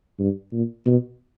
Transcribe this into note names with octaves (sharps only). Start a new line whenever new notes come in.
G2
A#2
B2